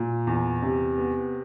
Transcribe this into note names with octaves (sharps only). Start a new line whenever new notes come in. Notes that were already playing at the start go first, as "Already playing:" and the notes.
Already playing: A#2
E2
C3
B3